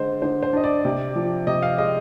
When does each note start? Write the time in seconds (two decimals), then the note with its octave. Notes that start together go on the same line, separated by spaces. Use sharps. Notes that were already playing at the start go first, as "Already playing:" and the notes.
Already playing: D3 G#3 C5
0.22 D3 C5
0.43 C5
0.53 D4 D#5
0.64 D5
0.85 C3
1.16 F3
1.47 C3 D#5
1.62 F5
1.78 G#3 D#5